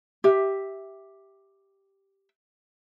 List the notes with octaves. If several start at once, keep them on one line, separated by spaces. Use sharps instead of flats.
G4 E5